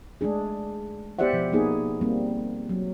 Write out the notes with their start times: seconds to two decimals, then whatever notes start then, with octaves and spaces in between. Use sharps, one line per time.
0.21 G#3 A3 D4 G#4
1.19 B3 G4 C5 D5 E5 F#5
1.33 B2 F3
1.52 A#3 B3 D#4 G#4
2.01 G3 A#3 C4
2.69 F#3